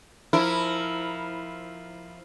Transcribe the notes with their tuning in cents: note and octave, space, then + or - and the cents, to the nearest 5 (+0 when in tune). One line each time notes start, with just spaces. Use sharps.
F3 +0 E4 -10 A#4 -10